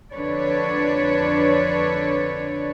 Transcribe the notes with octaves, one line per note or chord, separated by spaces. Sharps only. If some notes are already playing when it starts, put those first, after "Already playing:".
F2 D3 D4 B4 C#5 D5